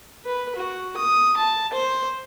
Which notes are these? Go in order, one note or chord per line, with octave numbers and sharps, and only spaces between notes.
B4
F#4
D#6
A5
C5